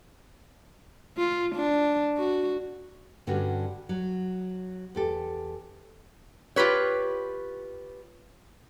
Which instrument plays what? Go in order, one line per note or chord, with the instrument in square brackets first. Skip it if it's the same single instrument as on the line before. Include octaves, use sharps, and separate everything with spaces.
[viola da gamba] F4
D4
F#4
[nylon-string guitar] G2 D3 G3 C#4 F#4
F#3
E2 G4 A4
[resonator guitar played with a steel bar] F4 G4 B4 C#5